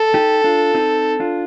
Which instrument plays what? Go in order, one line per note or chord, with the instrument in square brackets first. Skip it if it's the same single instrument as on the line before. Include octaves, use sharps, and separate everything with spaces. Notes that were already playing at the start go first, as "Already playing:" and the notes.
Already playing: [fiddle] A4
[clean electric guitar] D#4 G4
D4 F4
C4 D#4
D4 F4